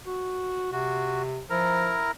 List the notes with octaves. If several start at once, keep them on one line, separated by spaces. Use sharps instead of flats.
F#4
C3 F#4
F3 E4 A#4 A#5